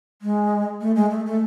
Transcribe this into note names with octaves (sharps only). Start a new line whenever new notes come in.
G#3
A3
G#3
A3
A3